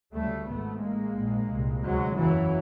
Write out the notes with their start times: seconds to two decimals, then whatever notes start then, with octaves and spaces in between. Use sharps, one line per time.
0.12 D2 C#3 G3 A3
0.47 G#1 G#2 A3 B3
0.80 A1 A2 G#3 A#3
1.14 A#1 G#2
1.48 C2 A#2
1.82 D2 C3 F#3 G#3
2.16 F#1 E2 C#3 E3 F#3